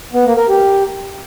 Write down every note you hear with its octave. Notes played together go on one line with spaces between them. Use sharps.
B3
A#3
A#4
G4